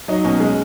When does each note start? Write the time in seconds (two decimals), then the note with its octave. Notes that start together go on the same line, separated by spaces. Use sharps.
0.08 F#3 D#4
0.24 B2 C#4
0.40 G#3